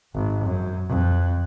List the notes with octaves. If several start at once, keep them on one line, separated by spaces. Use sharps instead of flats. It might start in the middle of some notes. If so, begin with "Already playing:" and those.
G#1
F#2
F2